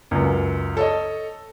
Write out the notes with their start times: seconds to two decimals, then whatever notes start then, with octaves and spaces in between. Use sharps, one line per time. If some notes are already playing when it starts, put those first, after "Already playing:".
0.11 C#2 F#2
0.77 A4 C#5 D#5